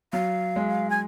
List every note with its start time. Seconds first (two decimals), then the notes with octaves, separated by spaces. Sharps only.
0.13 F#3 F5
0.56 G#3
0.90 G#5